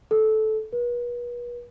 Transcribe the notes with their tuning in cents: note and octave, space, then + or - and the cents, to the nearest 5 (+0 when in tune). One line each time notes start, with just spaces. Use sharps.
A4 -15
B4 -40